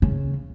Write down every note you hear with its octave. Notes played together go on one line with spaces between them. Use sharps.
C#3